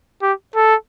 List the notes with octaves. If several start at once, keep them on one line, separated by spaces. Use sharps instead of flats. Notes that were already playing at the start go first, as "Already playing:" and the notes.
G4
A4